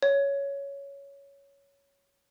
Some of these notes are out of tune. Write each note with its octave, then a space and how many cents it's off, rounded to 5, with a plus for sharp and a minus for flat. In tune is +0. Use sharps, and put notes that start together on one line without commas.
C#5 +10